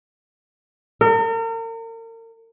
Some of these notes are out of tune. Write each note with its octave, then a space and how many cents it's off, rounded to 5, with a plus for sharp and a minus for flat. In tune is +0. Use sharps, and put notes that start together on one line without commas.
A#4 -40